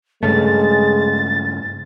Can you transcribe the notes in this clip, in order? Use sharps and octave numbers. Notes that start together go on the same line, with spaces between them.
G2 C#3 G#3 A3 A6